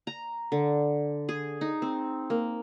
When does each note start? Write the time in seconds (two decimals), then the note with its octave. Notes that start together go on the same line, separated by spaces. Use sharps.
0.07 A#5
0.52 D3
1.29 G#4
1.61 D#4
1.82 C4
2.30 A#3